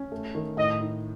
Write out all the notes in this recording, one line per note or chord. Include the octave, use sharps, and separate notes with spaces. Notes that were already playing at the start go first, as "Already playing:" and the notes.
Already playing: C#4
A3
D#3
A2 D#5
D#4